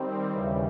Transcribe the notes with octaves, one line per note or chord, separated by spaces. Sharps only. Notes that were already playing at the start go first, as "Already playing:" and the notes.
Already playing: D#3 G3 C4
D#2 C#3 E3 G3